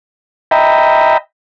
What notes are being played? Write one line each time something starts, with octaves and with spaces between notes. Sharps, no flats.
D#5 E5 G5 A#5 B5